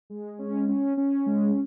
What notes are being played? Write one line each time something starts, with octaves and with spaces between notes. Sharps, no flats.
G#3
C#4
C#4
C#4
G#3